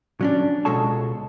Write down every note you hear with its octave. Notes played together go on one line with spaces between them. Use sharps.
F#3 C#4 D4
C#2 B2 G#3 A4 C#5 A5